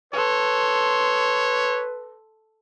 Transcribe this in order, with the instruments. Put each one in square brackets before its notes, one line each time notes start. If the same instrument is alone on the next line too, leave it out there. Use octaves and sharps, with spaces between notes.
[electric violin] A4 C6 [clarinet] B4 [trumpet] C#5